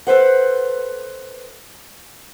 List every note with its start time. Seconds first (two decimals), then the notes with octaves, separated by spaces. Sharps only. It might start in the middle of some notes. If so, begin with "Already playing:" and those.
0.07 A4 B4 C5 F#5